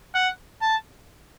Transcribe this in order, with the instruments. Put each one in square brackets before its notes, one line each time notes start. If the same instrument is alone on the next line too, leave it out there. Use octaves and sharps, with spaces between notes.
[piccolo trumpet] F#5
A5